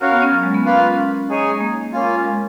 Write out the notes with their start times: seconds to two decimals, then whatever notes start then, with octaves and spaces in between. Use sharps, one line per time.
0.01 C#4 F#4 A#4 C#5 F5
0.11 B3
0.22 C#4
0.32 F#3
0.43 G#3
0.54 B3
0.65 A#3 C#4 F4 B4 F5
0.81 C#4
0.97 C#4
1.29 D#4 G#4 C#5 G#5
1.50 G#3
1.61 A#3
1.93 A#3 C#4 F4
2.24 G#3